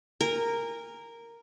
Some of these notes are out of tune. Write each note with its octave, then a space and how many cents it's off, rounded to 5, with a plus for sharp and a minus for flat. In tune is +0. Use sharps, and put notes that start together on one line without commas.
A#4 -5 G#5 -40